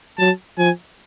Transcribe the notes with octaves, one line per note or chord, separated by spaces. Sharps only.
F#3 A5
F3 G#5